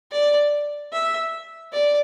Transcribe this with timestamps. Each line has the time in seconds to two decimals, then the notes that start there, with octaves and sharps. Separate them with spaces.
0.12 D5
0.92 E5
1.72 D5